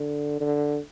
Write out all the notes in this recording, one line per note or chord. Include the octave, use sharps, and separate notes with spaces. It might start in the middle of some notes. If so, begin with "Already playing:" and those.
Already playing: D3
D3